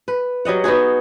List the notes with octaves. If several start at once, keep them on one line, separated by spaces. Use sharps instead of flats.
B4
F#3 G3 D#5 F#5
B3 D#4 F#4 G#4